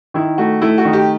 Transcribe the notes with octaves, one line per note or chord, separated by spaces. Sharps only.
D#3 E4
A3 F#4
A3 E4
F#4
D#3
G4